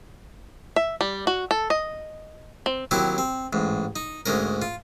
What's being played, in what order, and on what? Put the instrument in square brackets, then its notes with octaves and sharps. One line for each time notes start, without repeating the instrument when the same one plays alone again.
[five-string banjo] E5
G3
F#4
A4
D#5
C4
[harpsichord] D#2 F#3 C4 E4 G4
C4
A1 G#2
D#4
D2 G#2 C#4 A#4
F4